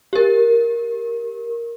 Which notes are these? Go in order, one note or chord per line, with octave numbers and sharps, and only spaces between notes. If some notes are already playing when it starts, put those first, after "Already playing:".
G4 A#4